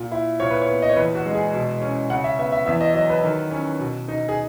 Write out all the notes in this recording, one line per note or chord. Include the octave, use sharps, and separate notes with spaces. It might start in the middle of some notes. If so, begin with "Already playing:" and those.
Already playing: A#2
E4
A#2 C#5
B4
C#5
B3
D#5
C#5
E2 B4
F#4
G#3
G#4
B2
C#4
C#3 F#5
E5
B3 E5
E5
E2 E5
D#5
F#3 D#5
B4
D#3
C#4
B2
D#4
G#4